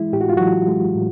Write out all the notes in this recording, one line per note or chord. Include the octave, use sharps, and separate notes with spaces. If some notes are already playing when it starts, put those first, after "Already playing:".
Already playing: E3 G#3 E4
A2 G4
F#4
F4
E3 F#3 F#4
G#3
A2